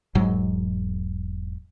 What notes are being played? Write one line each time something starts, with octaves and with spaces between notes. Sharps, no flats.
E1 G#2 F#3 G#3